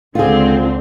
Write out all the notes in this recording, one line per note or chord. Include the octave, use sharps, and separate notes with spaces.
C#2 D3 C4 F4 G#4